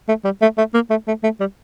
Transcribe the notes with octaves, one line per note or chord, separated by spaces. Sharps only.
A3
G3
A3
A3
A#3
A3
A3
A3
G3